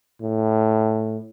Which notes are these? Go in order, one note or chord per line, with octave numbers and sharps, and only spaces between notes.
A2